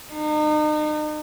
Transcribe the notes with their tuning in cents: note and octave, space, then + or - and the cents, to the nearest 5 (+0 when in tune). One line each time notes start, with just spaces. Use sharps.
D#4 -40